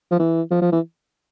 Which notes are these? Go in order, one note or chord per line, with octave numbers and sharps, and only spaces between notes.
F3
E3
F3
F3
E3